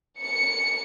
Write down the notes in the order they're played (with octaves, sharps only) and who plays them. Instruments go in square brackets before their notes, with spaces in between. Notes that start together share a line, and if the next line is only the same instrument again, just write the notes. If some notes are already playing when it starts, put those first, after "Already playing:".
[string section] C#7